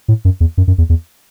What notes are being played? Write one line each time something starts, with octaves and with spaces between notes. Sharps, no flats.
A2
F#2
E2
F#2
F#2
E2
E2